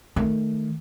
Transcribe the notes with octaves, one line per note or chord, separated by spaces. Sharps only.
D#3 A3